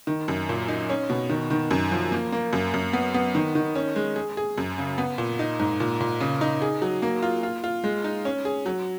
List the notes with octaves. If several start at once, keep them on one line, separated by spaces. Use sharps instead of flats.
D#3
F#2
A#2
D#4
C#4
B2
D#3
D#3
F#2
F3
A#3
A#3
F#2
F#2
B3
B3
D#3
D#3
C#4
G#3
G#4
G#4
F#2
C#3
B3
A#2
D#4
G#2
A#2
A#2
C#3
D#4
G#4
F#3
A#3
F4
F4
F4
G#3
D#4
C#4
G#4
F#3